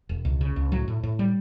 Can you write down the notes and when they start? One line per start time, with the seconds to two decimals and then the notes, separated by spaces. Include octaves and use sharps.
0.09 E1
0.25 C#2
0.41 C#3
0.56 C#2
0.72 A2 F#3
0.88 A2
1.03 A2
1.19 G3